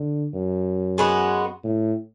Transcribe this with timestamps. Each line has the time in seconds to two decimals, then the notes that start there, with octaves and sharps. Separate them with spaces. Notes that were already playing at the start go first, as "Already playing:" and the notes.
Already playing: D3
0.34 F#2
0.98 G#3 B3 F#4
1.64 A2